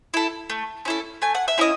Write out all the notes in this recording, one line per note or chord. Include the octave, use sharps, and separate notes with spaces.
E4 A4
A3
C#4 E4 A4
A3 G#5
F#5
E5
C#4 E4 A4 D#5